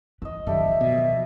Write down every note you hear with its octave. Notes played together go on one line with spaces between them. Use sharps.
E3 D#5 E6
D1 F#2 D#3 F3 G3 G4 A4 E5
B2